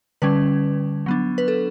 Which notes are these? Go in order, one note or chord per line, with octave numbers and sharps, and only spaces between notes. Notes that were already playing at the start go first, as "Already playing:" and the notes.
D3 G3 C#4 B4
F#3 B3 D4
B4
A4